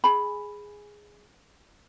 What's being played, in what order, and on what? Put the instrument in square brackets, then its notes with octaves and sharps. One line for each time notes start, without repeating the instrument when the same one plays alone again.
[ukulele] G#4 B5